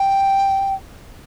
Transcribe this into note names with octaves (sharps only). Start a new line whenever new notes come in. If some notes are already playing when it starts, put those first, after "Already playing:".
Already playing: G5